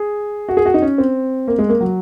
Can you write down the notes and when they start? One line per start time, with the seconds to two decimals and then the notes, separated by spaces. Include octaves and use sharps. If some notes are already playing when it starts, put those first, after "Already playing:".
Already playing: G#4
0.49 F#4
0.57 G#4
0.66 F#4
0.74 D#4
0.82 C#4
0.98 C4
1.48 A#3
1.58 G#3
1.69 A#3
1.81 F#3